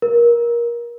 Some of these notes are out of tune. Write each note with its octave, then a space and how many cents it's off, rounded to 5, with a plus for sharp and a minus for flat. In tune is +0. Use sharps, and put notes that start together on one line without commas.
A#4 +20